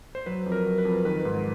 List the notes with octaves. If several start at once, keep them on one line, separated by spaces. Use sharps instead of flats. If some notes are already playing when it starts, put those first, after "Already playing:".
C5
F#3 B4
F2
A#4
F#3
B4
F2
D#3 B4
G#2